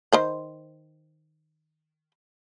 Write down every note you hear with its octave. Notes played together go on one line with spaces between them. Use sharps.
D#3 C5 B5